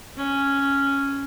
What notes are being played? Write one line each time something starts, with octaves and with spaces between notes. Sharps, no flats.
C#4